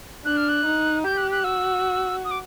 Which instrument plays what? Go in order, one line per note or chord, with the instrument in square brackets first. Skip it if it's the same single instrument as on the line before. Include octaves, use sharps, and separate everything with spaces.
[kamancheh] D4 [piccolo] F#6
[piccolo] F6
F#6
[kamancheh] D#4
[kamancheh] G4 [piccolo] G6
[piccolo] F#6
F#6
[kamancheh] F#4 [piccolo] E6
[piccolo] D#6
D6